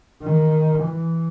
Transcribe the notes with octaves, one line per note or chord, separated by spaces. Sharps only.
D#3
E3